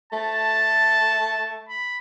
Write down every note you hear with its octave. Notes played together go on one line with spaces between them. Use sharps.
A3 A5
B5